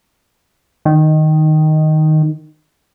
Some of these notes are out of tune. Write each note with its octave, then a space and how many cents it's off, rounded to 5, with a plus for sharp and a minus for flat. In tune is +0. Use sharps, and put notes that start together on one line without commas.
D#3 -5